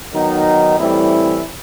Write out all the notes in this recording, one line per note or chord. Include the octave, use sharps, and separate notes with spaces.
D#3 F#3 B3 D#4
A2 E3 G3 C4 E4